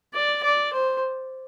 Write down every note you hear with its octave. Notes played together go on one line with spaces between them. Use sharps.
D5
D5
C5